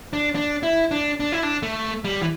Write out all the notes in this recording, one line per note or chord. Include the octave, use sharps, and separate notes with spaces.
D4
D4
E4
D4
D4
E4
D4
A3
G3
E3